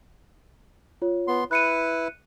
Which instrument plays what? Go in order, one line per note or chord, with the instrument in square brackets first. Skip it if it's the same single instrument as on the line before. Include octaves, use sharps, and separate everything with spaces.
[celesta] F4 C#5
[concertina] B3 C6
[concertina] E4 B4 [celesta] F#6 C#7 D#7